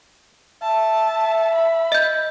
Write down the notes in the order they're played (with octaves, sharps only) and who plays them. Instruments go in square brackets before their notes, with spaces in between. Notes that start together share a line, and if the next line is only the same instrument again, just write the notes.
[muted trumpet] E5 [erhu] A5
[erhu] B5
[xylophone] D#5 G6